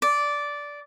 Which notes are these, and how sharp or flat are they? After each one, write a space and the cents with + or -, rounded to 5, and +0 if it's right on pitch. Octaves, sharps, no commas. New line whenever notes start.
D5 -10